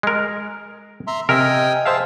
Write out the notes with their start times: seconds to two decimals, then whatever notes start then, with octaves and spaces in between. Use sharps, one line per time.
0.03 G#3 A#4
1.07 E5 A#5 C6
1.29 C3 A#4 D#5 E5 G5 G#5
1.86 G#4 C5 E5 F5 A5